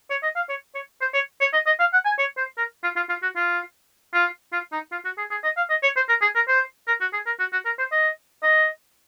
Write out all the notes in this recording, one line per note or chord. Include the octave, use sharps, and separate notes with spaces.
C#5
D#5
F5
C#5
C#5
C5
C#5
C#5
D#5
D#5
F5
F#5
G#5
C#5
C5
A#4
F4
F4
F4
F#4
F4
F4
F4
D#4
F4
F#4
G#4
G#4
D#5
F5
D#5
C#5
C5
A#4
G#4
A#4
C5
A#4
F#4
G#4
A#4
F#4
F#4
A#4
C5
D#5
D#5